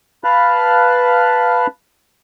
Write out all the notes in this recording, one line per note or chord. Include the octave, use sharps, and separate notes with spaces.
B4 F5 A5 B5 F6 F#6